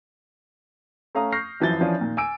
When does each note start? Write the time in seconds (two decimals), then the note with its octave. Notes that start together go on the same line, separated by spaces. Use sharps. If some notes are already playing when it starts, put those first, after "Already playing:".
1.15 A3 C#4 F5 A#5 D#6
1.32 C#6 F6 G6 A#6 C7
1.60 F#2 E3 F3 A6 G7
1.81 E3 F3 C#4 D4 F4
1.98 A#2 D#3
2.17 G#5 D6 E6 D7